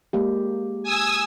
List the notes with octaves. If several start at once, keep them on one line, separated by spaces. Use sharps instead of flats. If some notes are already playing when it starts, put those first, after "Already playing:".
G#3 A#3 G4
G#5 D#6 E6